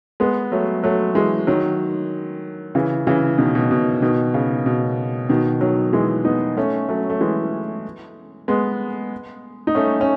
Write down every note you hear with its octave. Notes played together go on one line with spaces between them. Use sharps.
G#3 B3
F#3 A3
F#3 A3
E3 G#3
D#3 F#3
C#3 E3
C#3 E3
B2 D#3
B2
B2
B2 D#3
C#3
B2
B2 D#3
D#3 F#3
E3 G#3
B3 D#4
A3 C#4
F#3 A3
A3
E3 G#3
G#3 B3
D#4
A3 C#4
C#4